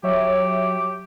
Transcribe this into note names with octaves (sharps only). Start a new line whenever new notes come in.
F#3 G4 C#5 E5